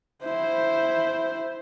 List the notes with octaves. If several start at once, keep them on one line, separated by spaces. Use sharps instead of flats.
E4 C5